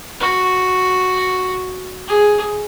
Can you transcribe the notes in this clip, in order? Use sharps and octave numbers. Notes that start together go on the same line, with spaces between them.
F#4
G#4